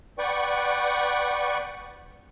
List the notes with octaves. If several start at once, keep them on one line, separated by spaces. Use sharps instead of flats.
B4 D5 F#5 G5 C#6